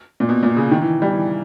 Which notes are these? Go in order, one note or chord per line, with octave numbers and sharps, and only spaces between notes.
A#2
B2
A#2
C#3
D#3
E3
G3
E3